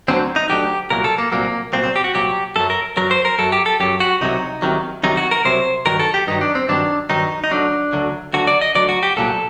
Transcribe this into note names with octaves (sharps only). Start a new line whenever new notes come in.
D2 D3 F#3 C4
D#4
D2 D3 F#3 G4
C2 A#2 F#3 A#4
A4
A#3
C2 A#2 F#3 A#3
C2 A#2 F#3 C4
C4
G4
F#4
C2 A#2 F#3 G4
F#2 F#3 A4
A#4
F#2 F#3 A#4
C5
A#4
F#2 F#3 A4
G4
A4
F#2 F#3 G4
F#4
C2 C3 D#3 F#3 D#4
C2 C3 D#3 F#3
C2 C3 D#3 F#3 D#4
F#4
A#4
C2 C3 F#3 C5
G2 D#3 F#3 A#4
A4
G4
G2 D#3 F#3 D#4
D4
C4
G2 D#3 F#3 D4
G2 D#3 F#3 D#4
D#4
D2 D3 F#3 D4
D2 D3 F#3
D2 D3 F#3 F#4
D5
D#5
D2 D3 F#3 D5
F#4
G4
C2 A#2 F#3 A4